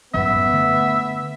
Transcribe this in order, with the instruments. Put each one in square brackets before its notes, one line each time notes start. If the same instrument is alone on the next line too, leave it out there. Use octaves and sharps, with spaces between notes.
[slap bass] D1 G1 F#2 [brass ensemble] B3 [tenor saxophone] E5
[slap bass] D3 A3